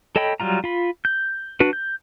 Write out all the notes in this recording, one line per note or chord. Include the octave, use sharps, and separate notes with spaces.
A4 C#5 D#5 G5 B5
F#3 G3 F4 A#5
F4 B5
G6
D4 F#4 B4
G6